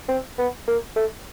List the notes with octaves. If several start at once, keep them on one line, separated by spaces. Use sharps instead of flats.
C4
B3
A#3
A3